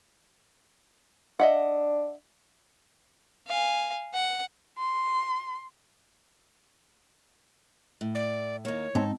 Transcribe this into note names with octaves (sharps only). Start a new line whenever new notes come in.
D4 D#5 E5 F#5
F5 G#5
F#5
C6
A2
D5
D#2 A#3 C#5
G#2 C4 D#4 A5